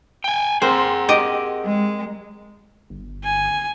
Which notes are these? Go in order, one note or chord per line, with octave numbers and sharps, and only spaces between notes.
G5 G#5
C4 G#4 A#4 C5 F#5
G4 D#5
G#3
G1
G#5